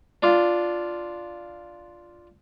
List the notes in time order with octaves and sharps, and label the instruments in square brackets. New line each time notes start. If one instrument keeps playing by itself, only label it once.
[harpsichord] D4 F4